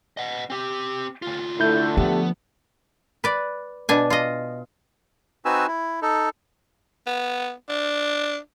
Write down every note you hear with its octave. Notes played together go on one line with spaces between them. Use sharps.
D#5 F#5
C4 G4
D2 F4
D3 A3 E4 G6
F3 B3 G4
B4 D5
B2 D4 G#5
F4 D#5
C4 D#4 F#4 B4 G#5 E6
E4
D#4 A4
B3
D4